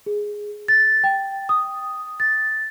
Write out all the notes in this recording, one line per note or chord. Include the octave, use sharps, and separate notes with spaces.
G#4
A6
G5
D#6
A6